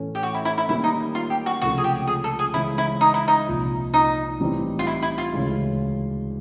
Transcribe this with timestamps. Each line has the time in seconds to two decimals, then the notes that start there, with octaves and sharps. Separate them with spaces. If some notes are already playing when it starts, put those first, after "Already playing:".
Already playing: A2 E3 A3 C#4
0.15 G4
0.23 F#4
0.34 E4
0.45 E4
0.58 E4
0.68 D#3 G3 A#3 C#4 E4
0.84 D#4
1.15 F4
1.30 G4
1.46 F#4
1.62 C#2 C3 F3 A3 C#4 F#4
1.78 G#4
1.84 G4
2.07 G#4
2.24 A4
2.39 G#4
2.54 C#3 E3 G#3 E4
2.78 E4
3.01 D#4
3.14 E4
3.28 D#4
3.47 C2 A#2 F3
3.94 D#4
4.40 A2 E3 G3 C4 D#4
4.79 F4
4.87 E4
5.02 E4
5.18 F4
5.34 D2 C#3 E3 G#3